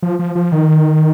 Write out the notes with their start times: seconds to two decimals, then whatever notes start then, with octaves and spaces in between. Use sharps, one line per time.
0.02 F3
0.19 F3
0.35 F3
0.52 D#3